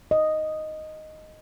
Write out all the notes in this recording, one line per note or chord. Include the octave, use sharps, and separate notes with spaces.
D#5